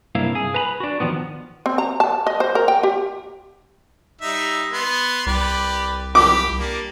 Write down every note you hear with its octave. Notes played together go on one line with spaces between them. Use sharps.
G2 C3 A#3 E4 F5
G#4
B4 A#5 B5
D4 F#4
D#2 A#2 D#3 F3 B3
C4
A#5
A5
D#5
C5
A#4
G5
G4
G3 D#4 E5
B3 C6
C2 G4 B4 D5
G4 B5 D6
G3 A#3 D4